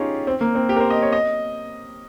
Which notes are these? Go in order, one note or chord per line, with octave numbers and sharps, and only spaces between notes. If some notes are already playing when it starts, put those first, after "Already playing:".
Already playing: C#4 D#4 F4 G4 G#4
C4
A#3
C4
G4
A#4
C5
D#5
C#5
D#5